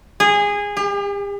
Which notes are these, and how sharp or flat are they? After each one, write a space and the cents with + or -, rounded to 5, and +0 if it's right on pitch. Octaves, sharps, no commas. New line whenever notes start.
G#4 -20
G4 +45